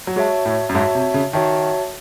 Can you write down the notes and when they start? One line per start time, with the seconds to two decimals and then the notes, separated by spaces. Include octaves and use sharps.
0.07 F#3
0.16 G#3 F#4 C#5 E5 A5
0.46 A2
0.69 F#2
0.75 G#2 F#4 C#5 E5 A5
0.95 C3
1.14 C#3
1.33 D#3 F#4 C#5 E5 A5